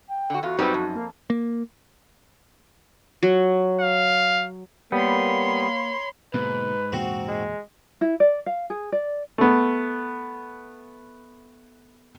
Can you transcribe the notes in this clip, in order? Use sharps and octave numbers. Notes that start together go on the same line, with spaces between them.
G5
D3 F#4
E2 F4 F#4
F#2 G3 C4 D#4 B4
F2
A#3
A#3
F#3
F5
G3 A#3 B3 C#5 B5 C6
G#2 B2 D3 A#3 B4
E2 A#2 C#3 C4 F#4
G#3
E4
D5
F5
G#4
D5
A3 B3